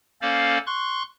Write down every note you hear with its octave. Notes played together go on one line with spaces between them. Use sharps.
A#3 C#4 A4 C5 D5 F5
C6 C#6 F#6